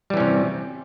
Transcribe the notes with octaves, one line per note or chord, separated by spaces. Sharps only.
C3 E3 G3 C#4